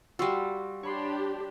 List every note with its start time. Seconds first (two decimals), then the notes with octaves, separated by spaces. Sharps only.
0.19 G3 F#4 F5 C6 E6
0.83 D4 G4 C#5 B5 C6